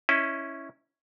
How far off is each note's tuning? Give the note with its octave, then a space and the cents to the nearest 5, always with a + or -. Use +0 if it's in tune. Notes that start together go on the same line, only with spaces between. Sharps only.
C#4 -5 E4 -5 D#5 +0